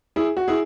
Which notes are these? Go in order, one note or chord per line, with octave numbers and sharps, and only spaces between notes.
E4 G#4
F#4
E4 G#4